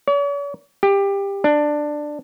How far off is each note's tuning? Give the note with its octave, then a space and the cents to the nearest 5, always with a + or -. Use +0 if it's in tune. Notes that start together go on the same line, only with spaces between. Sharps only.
C#5 +45
G4 +20
D4 +10